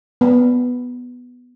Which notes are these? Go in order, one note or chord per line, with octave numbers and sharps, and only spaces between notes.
B3